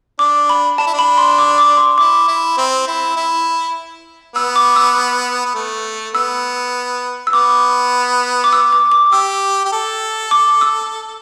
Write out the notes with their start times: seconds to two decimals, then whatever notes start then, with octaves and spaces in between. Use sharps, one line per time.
0.19 D4 D6
0.49 B5
0.78 D4 A5
0.86 E4
0.93 D4
0.99 B5
1.18 C6
1.38 D6
1.58 D6
1.77 C6
1.98 E4 D6
2.28 E4
2.57 C4
2.87 E4
3.17 E4
4.35 B3 E6
4.56 D6
4.76 E6
5.45 B3
5.55 A3
6.14 B3 E6
7.27 E6
7.33 B3 D6
8.44 D6
8.53 E6
8.72 D6
8.92 D6
9.12 G4 E6
9.65 G4
9.72 A4
10.31 D6
10.61 E6